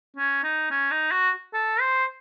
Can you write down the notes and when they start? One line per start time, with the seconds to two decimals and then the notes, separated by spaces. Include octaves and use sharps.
0.17 C#4
0.44 D#4
0.71 C#4
0.91 D#4
1.11 F#4
1.54 A4
1.80 C5